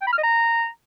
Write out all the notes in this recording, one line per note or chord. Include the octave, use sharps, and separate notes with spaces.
G5
B5
F6
D#5
A#5